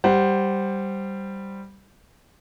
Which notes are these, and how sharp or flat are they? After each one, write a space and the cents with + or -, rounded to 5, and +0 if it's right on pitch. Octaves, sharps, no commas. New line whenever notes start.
G3 +0 C5 +0 F#5 +10